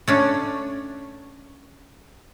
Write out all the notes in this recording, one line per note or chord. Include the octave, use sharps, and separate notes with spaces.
A3 C#4 D4